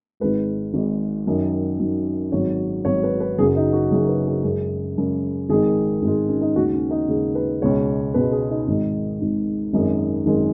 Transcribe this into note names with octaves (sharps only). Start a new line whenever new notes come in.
G#1 G#2 G#3 B4
G#1 G#2 G#3
F#2 D#3 F#3
F#2 D#3 F#3
G#1 G#2 F#3 C#5
G#1 G#2 F#3 C#5
B4
B4
F#1 F#2 C#3 F#3 G#4
D#4
F#4
F#1 F#2 C#3 F#3 G#4
B4
G#4
F#2 C#3 G#3 G#4
F#2 C#3 G#3
G#1 G#2 D#3 G#3 G#4
G#1 G#2 D#3 G#3
C#4
D#4
D#2 C#3 G#3 F#4
C#4
D#4
D#2 C#3 G#3
B4
C#2 B2 G#3 C#5
C#2 B2 G#3 B4
G#4
D#4
G#1 G#2 D#3
G#1 G#2 D#3
G#1 F#2 D#3 G#3 D#4
G#1 F#2 D#3 G#3